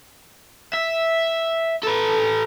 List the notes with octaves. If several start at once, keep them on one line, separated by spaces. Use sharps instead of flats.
E5
A4 B4